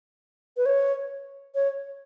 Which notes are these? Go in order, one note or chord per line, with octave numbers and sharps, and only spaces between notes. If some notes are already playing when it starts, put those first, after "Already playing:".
B4
C#5
C#5